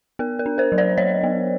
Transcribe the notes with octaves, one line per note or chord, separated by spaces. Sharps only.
B3 A#4
A#4
D4
A#4 C5
F#3
C5 D5
F#3 C#5 D#5
B3